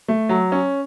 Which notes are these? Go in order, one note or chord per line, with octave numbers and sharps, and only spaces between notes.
A3
F#3
C#4